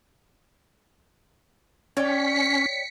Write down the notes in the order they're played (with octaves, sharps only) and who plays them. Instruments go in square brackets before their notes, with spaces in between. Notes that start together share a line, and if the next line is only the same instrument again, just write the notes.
[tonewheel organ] C#4 [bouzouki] C#5 D5 G5 [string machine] B6 C#7